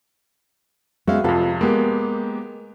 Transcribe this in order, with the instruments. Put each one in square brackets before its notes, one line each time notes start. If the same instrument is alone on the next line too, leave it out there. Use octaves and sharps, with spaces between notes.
[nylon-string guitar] G#3 B3 C#4 [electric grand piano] F#4 E5 F5
[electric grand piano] F2 C3 [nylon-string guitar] F4 A4 B4
[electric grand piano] G#3 B3 G4 [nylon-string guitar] A#3